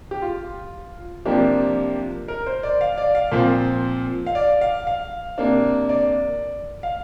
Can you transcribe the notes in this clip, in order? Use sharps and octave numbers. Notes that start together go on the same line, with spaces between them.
G4
F4
C3 F3 A#3 D4 G4
A#4
C5
D5
F5
D5
F5
A#2 F3 C4
F5
D5
F5
F5
C3 A#3 D4
D5
F5